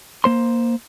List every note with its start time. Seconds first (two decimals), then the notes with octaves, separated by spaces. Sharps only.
0.24 A#3 C5 C6